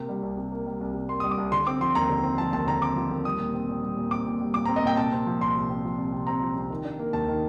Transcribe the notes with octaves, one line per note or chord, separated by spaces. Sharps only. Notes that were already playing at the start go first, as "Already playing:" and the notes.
Already playing: C3 A#3
G3
C2
C3
A#3
G3
C2
C3
A#3 C6
D#6
G3
D6
C2
D3 C6
C4 D6
F3 C6
D#2 A#5
D3
C4
F3 A5
D#2 A5
D3 A#5
C4 D6
F3
D#2
G3 D#6
A#2
C4
A#2
G3
A#2
C4 D6
A#2
G3
A#2 D6
A#5
C4
D#5
A#2 G5
C3 A5
C4
F3
C2 C6
C3
C4
F3
C2
C3
C4 A#5
F3
C2
D#3
D4
A#3
D#2 A5
D#3